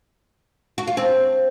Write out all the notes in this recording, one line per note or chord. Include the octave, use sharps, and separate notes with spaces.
F#4
F4
C4